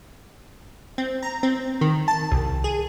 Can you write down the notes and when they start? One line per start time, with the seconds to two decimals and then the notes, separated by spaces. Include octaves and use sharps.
0.98 C4
1.23 A#5
1.43 C4
1.81 D#3
2.08 A5
2.31 C2
2.64 G#4